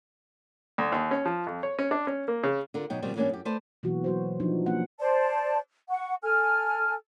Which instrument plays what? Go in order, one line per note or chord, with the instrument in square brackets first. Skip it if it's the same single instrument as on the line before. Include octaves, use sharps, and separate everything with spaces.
[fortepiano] D2
D#2
C#4
F3
F2
C#5
C#4
D4
C#4
A#3
C#3
[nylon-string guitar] D3 F4 A#4
B2 F#3 D#4 G5
B2 D#3 F3 G3 C4
G#2 E3 A#3 C#4 D4 G4
F#2 G4
A3 B4 C5 D5 A5
[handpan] B2 E3 F#3 A#3 F#4
F#3 F#4 C5
F3 D4 D#4
A#3 C#4 F#5
[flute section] C5 D5 A5
F#5 C#6
A4 G#5 F6